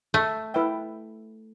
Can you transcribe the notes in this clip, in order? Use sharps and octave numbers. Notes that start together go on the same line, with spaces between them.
A3
E4 B4 E5 G5